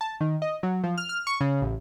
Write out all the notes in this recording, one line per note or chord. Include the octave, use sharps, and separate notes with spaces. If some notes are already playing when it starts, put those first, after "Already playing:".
A5
D#3
D#5
F#3
F3
F6
F6
C#6
C#3
A1